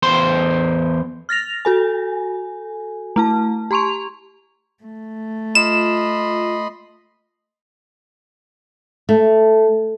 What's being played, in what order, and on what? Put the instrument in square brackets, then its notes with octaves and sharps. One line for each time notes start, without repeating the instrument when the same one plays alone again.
[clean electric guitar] E2 C5 C6
[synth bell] F6 A6 A#6 F7
F#4 A4 G#5
A3 E4 A5
G4 A#5 C6 C#6 F7
[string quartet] A3
[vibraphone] F4 [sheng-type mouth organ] D#5 B5 C6 [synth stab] E7
[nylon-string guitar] A3